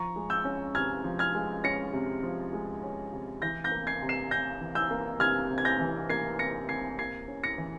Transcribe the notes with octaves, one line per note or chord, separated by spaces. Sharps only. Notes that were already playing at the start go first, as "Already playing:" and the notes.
Already playing: F3 A#5 C#6
G#3
E6 G6
C#4
C3 F6 G#6
F3
F6 G#6
G#3
C#4 A#6 C#7
C3
F3
G#3
C#4
C3
E3 G6 A#6
G6 A#6
A#3
G#6 C7
C3
C7 E7
C3 G6 A#6
E3
E6 G6
A#3
C3 F6 G#6
C3
G#6
G6 A#6
E3
A#3 G#6 C7
C3 A#6 C#7
C3 G#6 C7
A#3 G#6 C7
C#4
A#6 C#7
E3